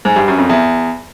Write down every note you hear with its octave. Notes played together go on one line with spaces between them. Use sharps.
G#2
G2
F#2
F2
E2